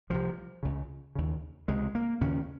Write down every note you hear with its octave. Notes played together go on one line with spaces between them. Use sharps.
C2 C3 F3
C#2 C#3
D#2 C#3
C#2 C3 G#3
A#3
D#2 C#3 C#4